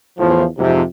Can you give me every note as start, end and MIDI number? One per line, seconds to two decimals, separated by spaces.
0.19 0.44 40
0.19 0.44 45
0.19 0.44 53
0.59 0.82 41
0.59 0.82 44
0.59 0.82 48